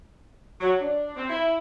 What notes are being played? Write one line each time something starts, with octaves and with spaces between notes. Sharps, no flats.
F#3
D4
C4
E4